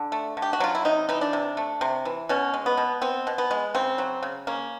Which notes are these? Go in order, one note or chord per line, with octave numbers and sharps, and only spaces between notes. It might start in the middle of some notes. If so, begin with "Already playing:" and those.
Already playing: D3
A3
D3
G4
F#4
F#3 F4
E4
C3 D#4
E3 D#4
D4
C3
A3
C3
E3
B2 C#4
G#3
B3
B2
B3 C4
B2
B3
G#3
C#3 C4
F#3
C#3
A#3 C#4